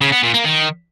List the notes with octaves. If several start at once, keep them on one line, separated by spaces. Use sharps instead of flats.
C#3
B3
A#2
A#3
D#3